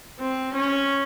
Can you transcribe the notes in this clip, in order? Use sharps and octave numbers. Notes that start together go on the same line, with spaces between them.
C4
C#4